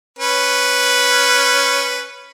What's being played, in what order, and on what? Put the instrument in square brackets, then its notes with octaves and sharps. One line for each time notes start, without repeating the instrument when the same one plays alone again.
[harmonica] C#4 B4